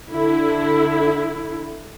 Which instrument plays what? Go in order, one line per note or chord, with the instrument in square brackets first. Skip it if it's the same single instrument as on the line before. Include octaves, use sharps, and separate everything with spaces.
[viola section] D3 E4